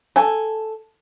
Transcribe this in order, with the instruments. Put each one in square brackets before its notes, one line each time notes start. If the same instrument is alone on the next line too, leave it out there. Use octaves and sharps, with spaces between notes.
[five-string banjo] A4 G#5